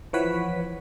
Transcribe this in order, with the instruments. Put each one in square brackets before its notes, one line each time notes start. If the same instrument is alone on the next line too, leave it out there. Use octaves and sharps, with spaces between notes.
[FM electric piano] E3 F3 B4 C#5 F#5 B6